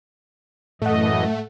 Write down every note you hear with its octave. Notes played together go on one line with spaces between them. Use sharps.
F#2 A2 E3 A3 D#5 F#5